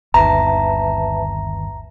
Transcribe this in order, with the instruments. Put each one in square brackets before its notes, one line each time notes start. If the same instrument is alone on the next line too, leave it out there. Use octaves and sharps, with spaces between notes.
[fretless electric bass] G1 D#2 D#3 [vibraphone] B4 E5 A5 [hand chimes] A#5